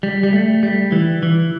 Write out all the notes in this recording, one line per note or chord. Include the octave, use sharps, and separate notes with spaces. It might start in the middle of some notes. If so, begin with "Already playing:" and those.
G3
G3
A3
G3
E3
E3